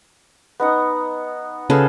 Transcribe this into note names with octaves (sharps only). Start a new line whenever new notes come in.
B3 D#4 F#5
C#3 F4 G#4 A4 B4 D#5